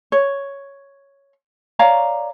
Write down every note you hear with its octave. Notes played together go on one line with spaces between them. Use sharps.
C#5
C#5 D5 F5 A#5